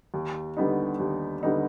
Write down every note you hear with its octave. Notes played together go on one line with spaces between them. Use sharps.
D#2
D3 G3 B3 D#4
D#2
D3 G3 B3 D#4